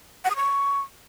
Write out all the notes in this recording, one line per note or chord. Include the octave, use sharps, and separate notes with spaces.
F#5
D#6
C#6